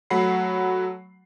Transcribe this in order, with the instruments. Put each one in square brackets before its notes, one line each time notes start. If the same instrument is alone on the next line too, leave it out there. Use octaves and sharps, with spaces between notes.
[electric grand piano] F#3 A3 F#5 B5 C7